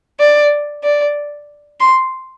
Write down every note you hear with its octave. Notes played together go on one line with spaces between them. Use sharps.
D5
D5
C6